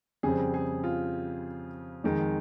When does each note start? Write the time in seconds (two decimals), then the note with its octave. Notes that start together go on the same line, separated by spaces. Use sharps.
0.23 F2 C#3 G3 C4 G#4
0.54 G#4
0.84 F4
2.04 F2 D#3 G#3